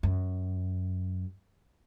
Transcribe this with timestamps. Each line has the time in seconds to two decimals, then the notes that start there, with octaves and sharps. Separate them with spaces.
0.03 F#2